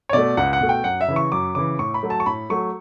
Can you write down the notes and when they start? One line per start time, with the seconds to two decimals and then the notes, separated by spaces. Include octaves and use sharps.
0.09 C#5
0.13 B2 A3 D5
0.37 C#2 F#5
0.53 F#5
0.61 B2 A3
0.69 G5
0.84 F#2 F#5
1.01 E5
1.08 C#3 E3
1.16 C#6
1.32 F#2 D6
1.55 C#3 E3 D6
1.79 A2 C#6
1.94 B5
2.03 F#3 A3
2.10 A5
2.20 C#6
2.26 A2 B5
2.50 F#3 A3 C#6